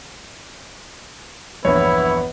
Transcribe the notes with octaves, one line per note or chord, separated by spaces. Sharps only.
A#1 E2 G2 B3 E4 C#5